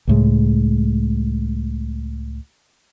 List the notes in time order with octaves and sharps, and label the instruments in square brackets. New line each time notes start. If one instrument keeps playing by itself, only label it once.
[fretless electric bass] C#2 A2 G#3